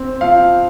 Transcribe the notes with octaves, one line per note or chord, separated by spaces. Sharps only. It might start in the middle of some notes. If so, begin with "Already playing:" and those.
Already playing: C4
F3 F5